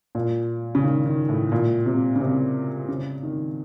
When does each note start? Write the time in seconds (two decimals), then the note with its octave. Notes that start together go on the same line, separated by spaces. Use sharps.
0.15 A#2
0.75 C#3
0.83 D#3
1.06 D#3
1.29 A2
1.52 A#2
1.86 C3
2.16 C#3
2.20 C3
2.88 C#3
3.23 D#3